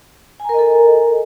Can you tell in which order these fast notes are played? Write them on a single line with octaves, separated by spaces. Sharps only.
G#5 A#5 A#4 D#5 A4